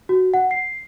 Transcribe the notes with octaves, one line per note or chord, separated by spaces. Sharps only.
F#4
F#5
C7